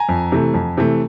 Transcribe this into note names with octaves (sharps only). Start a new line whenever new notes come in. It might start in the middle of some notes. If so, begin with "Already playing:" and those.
Already playing: G#5 A#5
F2
C3 E3 A3
F2
C3 E3 A3